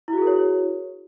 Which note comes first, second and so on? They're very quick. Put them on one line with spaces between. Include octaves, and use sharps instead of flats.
E4 F#4 G#4 A#4 C#5